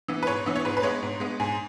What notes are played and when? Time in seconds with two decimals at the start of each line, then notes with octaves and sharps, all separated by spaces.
0.08 E3 B3
0.23 B4
0.27 G#2 C#5
0.46 E3 B3
0.56 C#5
0.65 G#2 B4
0.77 B4
0.83 G#3 B3 C#5
1.02 G#2
1.20 G#3 B3
1.40 G#2 G#5